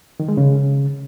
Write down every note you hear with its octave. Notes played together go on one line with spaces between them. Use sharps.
D#3
G#3
C#3